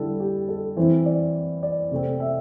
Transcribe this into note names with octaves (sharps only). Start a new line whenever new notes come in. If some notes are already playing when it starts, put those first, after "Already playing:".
Already playing: D3 G3 E4 A4
G4
A4
E3 C4 E4 C5
D5
D5
C3 A3 C4
E5